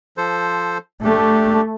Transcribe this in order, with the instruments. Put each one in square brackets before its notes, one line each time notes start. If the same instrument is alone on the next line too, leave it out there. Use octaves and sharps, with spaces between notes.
[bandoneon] F3 A4 C5
[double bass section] A3 [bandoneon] D4 G4